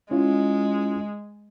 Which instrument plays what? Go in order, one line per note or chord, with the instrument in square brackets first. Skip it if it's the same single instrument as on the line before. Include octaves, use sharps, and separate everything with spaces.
[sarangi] G#3 [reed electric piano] C#4 E4 F4